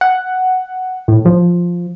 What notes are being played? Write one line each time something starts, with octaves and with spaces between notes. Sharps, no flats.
F#5
A2
F3